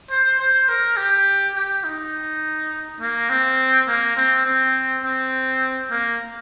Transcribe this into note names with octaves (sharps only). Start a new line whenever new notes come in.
C5
C5
A#4
G4
G4
D#4
A#3
C4
A#3
C4
C4
C4
A#3